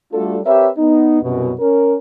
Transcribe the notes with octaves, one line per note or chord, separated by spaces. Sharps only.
G3 A3 D4 F4 F#4 A4
C4 G4 A#4 B4 C#5 E5
B3 D#4
C2 F#2 B2
C#4 A#4